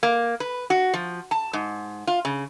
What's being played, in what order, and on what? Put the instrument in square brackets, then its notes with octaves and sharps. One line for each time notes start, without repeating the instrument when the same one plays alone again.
[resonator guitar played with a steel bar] A#3
B4
F#4
F3
A5
G#2
F4
C#3